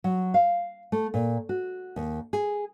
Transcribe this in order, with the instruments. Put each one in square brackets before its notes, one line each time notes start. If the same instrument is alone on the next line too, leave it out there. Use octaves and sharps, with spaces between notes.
[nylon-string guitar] F#3
F5
A3
A#2
F#4
D#2
G#4